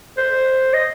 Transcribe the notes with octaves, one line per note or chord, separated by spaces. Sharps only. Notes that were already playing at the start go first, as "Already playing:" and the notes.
C5
D#5